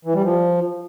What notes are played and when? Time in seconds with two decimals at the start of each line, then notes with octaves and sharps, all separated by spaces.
0.05 E3
0.14 G3
0.23 F3